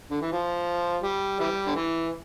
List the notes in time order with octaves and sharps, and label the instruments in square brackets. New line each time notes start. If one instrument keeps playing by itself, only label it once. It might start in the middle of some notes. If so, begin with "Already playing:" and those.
[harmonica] D3
E3
F3
G3
E3 G3
D3
E3